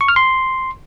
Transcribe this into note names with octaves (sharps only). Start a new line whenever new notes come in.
C#6
F6
C6